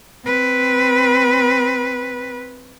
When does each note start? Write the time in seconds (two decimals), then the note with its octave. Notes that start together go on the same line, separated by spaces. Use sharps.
0.25 C4 B4